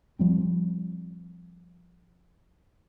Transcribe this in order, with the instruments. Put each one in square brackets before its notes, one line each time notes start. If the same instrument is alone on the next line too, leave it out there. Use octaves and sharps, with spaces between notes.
[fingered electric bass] F3 G3 C4